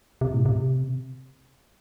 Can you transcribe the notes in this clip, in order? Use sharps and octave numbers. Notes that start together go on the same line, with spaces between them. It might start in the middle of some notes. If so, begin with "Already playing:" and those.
C3
A2
C3